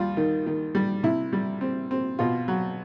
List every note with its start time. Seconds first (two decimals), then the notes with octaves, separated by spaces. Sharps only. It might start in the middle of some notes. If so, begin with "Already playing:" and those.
Already playing: D#2 G3 F4
0.17 D#3
0.46 D#3
0.75 G3
1.03 C3 E4
1.33 G3
1.61 C4
1.91 C4
2.19 B2 F4
2.48 F#3